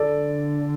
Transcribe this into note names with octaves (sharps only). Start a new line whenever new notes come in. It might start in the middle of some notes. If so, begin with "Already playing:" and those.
Already playing: D3 A4 D5